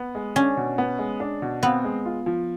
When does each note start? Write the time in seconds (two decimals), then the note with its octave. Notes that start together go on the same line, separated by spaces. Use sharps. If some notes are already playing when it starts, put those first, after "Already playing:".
Already playing: B3
0.15 G#3
0.36 C#4 D4
0.57 B2
0.78 B3
0.99 G#3
1.20 D4
1.42 B2
1.63 B3 C4
1.84 G#3
2.05 F4
2.26 F3